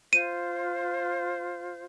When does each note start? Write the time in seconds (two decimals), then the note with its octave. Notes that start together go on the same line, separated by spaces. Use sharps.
0.13 F4 C5 D#7